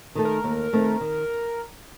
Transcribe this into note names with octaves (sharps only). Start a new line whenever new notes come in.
D#3 A3 D#4 A4
A#4
D#2
D#3 A3 C4 D#4
D#3